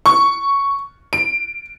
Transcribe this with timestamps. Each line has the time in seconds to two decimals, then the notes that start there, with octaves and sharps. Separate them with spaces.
0.06 C#6
1.13 D7